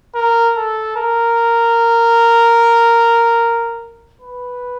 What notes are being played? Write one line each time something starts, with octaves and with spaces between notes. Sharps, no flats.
A#4
A4
A#4
B4